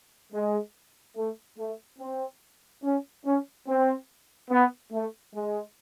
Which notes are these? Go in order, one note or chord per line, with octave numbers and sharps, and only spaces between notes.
G#3
A3
A3
C4
C#4
C#4
C4
B3
A3
G#3